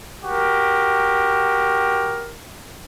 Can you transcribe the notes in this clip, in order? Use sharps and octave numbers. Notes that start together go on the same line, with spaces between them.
F#4 G4 A#4